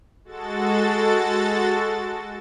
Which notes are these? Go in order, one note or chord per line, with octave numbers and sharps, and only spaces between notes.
G#3 F#4 A4 A6